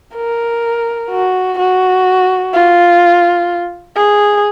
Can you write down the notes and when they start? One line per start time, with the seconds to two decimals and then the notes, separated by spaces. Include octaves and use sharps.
0.15 A#4
1.11 F#4
1.59 F#4
2.53 F4
3.96 G#4